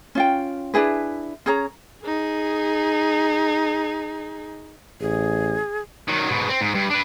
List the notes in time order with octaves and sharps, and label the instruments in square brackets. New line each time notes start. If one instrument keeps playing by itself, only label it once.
[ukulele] C#4 F4 G5
D4 E4 G#4 B4
C#4 G#4 C#5 A#5
[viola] D#4 G#4
[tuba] A1 [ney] G#4
[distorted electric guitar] D#3 F#3
G#2 B2
C4
G#2
G2
D4 B4